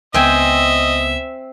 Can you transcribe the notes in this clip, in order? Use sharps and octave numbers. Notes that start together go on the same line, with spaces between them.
C#2 B3 C4 D#5 E5 G5 G#5